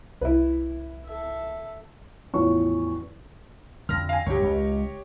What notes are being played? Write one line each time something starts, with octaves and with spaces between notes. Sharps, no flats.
C2 E4 B4
A4 E5
A1 E2 F3 F#4 C#5 C#6
F2 D3 F6 A#6
F5 G#5
D2 G2 C#3 G4 C#5
C#2